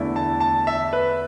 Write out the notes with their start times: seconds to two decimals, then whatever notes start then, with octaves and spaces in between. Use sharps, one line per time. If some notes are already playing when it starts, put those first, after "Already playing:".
Already playing: E2 D3 A3 E4
0.16 A5
0.40 A5
0.67 E5
0.93 B4